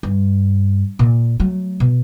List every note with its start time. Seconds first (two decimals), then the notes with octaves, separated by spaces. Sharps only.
0.03 G2
0.99 A#2
1.40 F#3 A3
1.80 B2